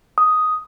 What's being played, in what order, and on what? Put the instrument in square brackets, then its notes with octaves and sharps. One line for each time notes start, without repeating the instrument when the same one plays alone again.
[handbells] D#6